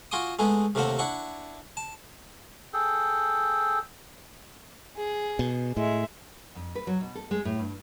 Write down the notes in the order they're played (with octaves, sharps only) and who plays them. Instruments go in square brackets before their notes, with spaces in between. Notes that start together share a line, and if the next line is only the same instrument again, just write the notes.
[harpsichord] F4 F#4 G#5 C6 D6 D#6
G#3 A3 B3 G#4
D#2 C3 A3 A#3 C5 F#5
D4 E4 F#5 C#6
A5
[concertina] G#4 A4 G5
[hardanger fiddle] G#4
[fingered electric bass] B2
[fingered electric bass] A2 [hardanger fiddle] G#3 E5
[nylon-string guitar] F2
B4
F#3
B2
A4
G#3
A2
G2